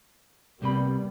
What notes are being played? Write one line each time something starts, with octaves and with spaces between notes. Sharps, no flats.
C2 C3 G3 A#3 B3 B5